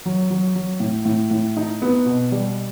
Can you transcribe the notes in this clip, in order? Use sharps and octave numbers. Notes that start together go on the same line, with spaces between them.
F#3
F#3
F#3
A2
A2
A2
D#4
B3
B2
G3